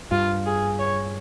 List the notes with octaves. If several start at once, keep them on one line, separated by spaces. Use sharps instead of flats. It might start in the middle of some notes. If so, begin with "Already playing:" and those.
G2 F4
G#4
C#5